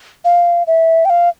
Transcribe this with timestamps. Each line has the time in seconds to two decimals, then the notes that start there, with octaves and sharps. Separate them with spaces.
0.25 F5
0.67 E5
1.05 G5
1.10 F5